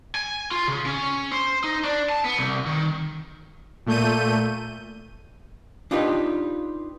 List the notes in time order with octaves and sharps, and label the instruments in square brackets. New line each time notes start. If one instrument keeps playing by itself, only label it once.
[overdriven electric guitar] G#5
F4
C#3
C#4
C5
D#4
D4
A5
B3
C2
D#3
[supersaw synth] A#2 A3 G6 D#7
[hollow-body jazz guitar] D4 D#4 F4 G4 B4